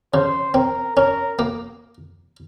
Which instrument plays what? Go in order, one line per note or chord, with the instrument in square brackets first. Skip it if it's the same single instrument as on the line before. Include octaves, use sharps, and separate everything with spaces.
[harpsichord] C#3 [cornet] C5
[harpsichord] C4 [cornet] A#4
[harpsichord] C#4 [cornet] A#4
[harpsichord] A#3